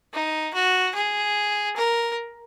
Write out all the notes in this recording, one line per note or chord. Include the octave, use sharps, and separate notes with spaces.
D#4
F#4
G#4
A#4